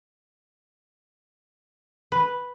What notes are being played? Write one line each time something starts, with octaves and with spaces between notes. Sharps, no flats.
B4